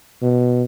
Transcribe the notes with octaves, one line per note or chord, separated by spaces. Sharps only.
B2